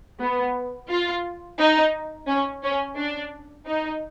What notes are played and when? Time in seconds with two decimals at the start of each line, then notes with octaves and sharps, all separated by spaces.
0.20 B3
0.89 F4
1.58 D#4
2.28 C#4
2.63 C#4
2.96 D4
3.66 D#4